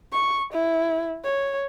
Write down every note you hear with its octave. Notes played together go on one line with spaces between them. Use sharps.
C#6
E4
C#5